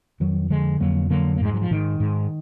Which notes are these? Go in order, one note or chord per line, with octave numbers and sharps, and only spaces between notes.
F2 D#3 F#3
D3 F3 G#3
F2 F#3 A#3
D3 F#3 A#3
A#3
G#2 G#3
F#3
F3
G#2 D#3
G#2